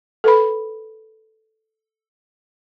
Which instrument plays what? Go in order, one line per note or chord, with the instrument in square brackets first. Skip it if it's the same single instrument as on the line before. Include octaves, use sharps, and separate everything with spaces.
[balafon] A4 B4 B5